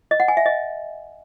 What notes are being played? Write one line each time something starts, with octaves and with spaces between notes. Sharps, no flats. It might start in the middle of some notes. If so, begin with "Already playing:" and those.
D#5
F#5
G#5
E5
D#5